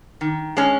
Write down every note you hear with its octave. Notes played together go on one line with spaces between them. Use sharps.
D#3
G#3 C#4